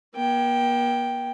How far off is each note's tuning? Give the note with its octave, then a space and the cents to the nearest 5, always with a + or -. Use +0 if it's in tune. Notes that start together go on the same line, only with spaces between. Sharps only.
A#3 +45 G5 +0